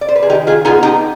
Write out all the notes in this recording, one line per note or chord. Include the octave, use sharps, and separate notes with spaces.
D5
C5
B4
G#4
D#3 D#4 G4
F4 G#4
B3 D#4 F4 G#4
D#4 G4